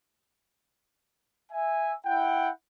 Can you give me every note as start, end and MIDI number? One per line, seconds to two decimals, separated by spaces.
1.51 1.93 76
1.51 1.93 80
2.05 2.49 64
2.05 2.49 78
2.05 2.49 79